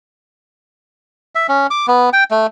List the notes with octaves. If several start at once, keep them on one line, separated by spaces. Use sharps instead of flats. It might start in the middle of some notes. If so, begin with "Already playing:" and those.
E5
C#4
D6
B3
G5
A3